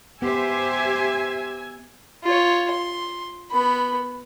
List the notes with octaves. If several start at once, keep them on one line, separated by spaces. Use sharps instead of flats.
B3 G4 C5 E5 G#5 E6 G#6
F4 C#5
C6
B3 B5